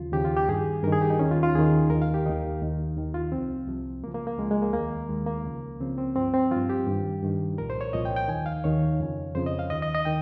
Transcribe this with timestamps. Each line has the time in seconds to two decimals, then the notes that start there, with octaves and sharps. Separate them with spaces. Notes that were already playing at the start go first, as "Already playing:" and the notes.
Already playing: D#2 C#3 F3 F4
0.12 D#2 C#3 F3 G4
0.25 F4
0.37 G4
0.48 G2 D#3 G#4
0.83 G2 A#4
0.87 D#3
0.92 G#4
1.02 G4
1.10 D#4
1.19 D#2 D#3 C#4
1.31 F4
1.43 F4
1.55 D#2 D#3 G#4
1.90 D#2 A#4
1.95 D#3
2.02 F5
2.14 G4
2.26 D#2 D#3 D#4
2.61 D#2 D#3
2.97 D#2 D#3
3.14 F4
3.32 C2 C3 F3 C4
3.67 C2 C3 F3
4.03 C#2 C#3 F3 A#3
4.15 A#3
4.27 A#3
4.39 C#2 C#3 F3 G#3
4.51 G#3
4.62 A#3
4.73 D#2 D#3 A#3
5.09 D#2 D#3 G#3
5.27 A#3
5.45 C#2 C#3 F3
5.80 C#2 C#3 F3 C4
5.97 C4
6.15 G2 F3 C4
6.34 C4
6.51 G2 F3 F4
6.69 G4
6.87 G2 D#3
7.23 G2 D#3
7.58 C2 A#2 F3 A#4
7.70 C5
7.81 C#5
7.93 C2 A#2 F3 D#5
8.05 G5
8.16 G5
8.28 D#2 D#3 G#5
8.46 F5
8.64 D#2 D#3 C#5
9.00 F2 C#3 F3
9.35 F2 C#3 F3 C5
9.46 D#5
9.59 F5
9.70 D#2 D#3 D#5
9.82 D#5
9.95 D#5
10.05 D#3 G5